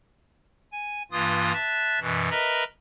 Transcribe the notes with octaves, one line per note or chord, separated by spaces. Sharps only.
G#5
G2 E3 A#3 F4 D#6
E5 A5 F#6 A6
F#2 B2 E3
A#4 B4 D#5 E5 A#5 B5